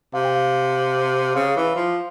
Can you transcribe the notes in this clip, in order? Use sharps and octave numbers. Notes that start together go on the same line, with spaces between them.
C3 F5
G5
F5
C#3 F5
E3
F3